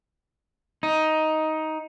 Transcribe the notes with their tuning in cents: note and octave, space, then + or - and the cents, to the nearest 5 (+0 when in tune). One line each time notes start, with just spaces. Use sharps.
D#4 +10